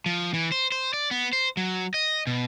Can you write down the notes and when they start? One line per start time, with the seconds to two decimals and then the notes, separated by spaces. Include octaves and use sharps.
0.06 F3
0.34 E3
0.52 C5
0.72 C5
0.93 D5
1.11 B3
1.33 C5
1.57 F#3
1.94 D#5
2.27 B2